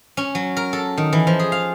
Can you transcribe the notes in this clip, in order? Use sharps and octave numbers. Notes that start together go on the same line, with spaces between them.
C#4
F#3
A#4
A4
D#3
E3
F3
G#4
F5